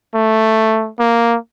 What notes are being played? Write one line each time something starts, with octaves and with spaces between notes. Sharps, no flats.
A3
A#3